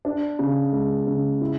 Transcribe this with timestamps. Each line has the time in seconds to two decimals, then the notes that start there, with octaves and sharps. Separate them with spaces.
0.05 D4
0.39 C#3
0.73 G#3
1.07 C#3
1.41 E4